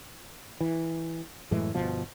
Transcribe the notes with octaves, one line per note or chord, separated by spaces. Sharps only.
E3
F#2 A2 E3 G#3
G1 B2 F3